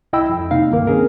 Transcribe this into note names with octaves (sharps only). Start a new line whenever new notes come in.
C2 E4 D#5 G5 B5 E6
F2
C3 A#3 D#4 F5
C#2 G2 D#3 A#3 A#4
C4 C#4 G#4 A#4